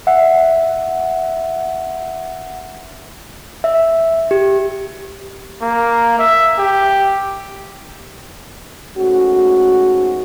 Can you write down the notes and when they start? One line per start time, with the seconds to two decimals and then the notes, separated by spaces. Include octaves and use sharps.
0.07 E5 F#5
3.64 E5
4.31 G4
5.62 A#3
6.19 E5
6.59 G4
8.97 G#2 A3 C#4 F#4